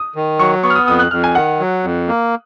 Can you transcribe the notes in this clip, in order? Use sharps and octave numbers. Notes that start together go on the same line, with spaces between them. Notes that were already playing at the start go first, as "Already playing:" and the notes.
Already playing: D#6
D#3
F#3 C#6
B3 C#6
F6
D#6
F2 D#6
F#6
F2 F6
G#5
D#3 F#5
F#3
F2
A#3